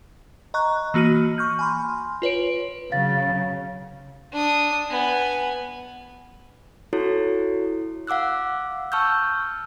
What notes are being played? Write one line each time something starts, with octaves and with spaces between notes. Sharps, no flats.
D#5 A#5 C#6 F#6
E3 A#3 F#4 F6 D#7
C#6 F6 G6
G#5 B5 C6
F4 B4 C#5 D7
C#3 F#3 F5 A6
D4 D#6
B3 G#5
E4 F#4 A4 C#5
F5 F#5 D6 E6 F#6
A5 C#6 E6 F6 G6